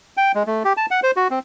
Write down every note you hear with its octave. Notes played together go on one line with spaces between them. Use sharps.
G5
G#3
A3
G4
A5
F#5
C5
F#4
C4